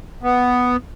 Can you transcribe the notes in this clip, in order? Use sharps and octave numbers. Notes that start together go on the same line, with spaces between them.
B3